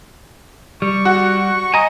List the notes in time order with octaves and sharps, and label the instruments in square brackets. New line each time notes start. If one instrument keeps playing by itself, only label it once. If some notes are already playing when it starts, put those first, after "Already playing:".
[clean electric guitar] G3 [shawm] C#6
[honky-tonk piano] F#4
[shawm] D#5 [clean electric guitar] G#5 A#5